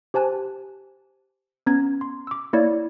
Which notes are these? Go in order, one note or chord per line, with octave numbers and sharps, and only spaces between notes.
G4 C5 G#5 A5 F#6
B3 C#4 A#5 G#6
C6
D6 E6
A#3 E4 C#5 D5 G#6